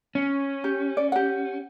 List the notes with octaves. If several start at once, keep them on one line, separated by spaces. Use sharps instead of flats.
C#4
G4
D5
G4 F#5